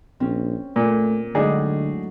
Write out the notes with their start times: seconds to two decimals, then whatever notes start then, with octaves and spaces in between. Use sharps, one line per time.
0.20 A#1 C4 C#4
0.76 A#2 A3 A#3
1.35 A2 D3 F#3 G#3 D4 D#4 G#4